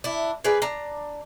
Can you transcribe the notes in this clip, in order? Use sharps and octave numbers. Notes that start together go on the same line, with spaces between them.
D4 E4
G#4 A#4 B4 D5
D4 A#5